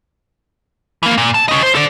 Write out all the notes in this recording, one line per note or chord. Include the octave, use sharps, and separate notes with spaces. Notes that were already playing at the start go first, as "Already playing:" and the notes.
E3 A#3
A#2
A5
C#4 D#5
C5
A4 D5